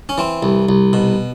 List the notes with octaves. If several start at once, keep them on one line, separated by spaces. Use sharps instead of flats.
C#4
E3 C4
C2
C2
B2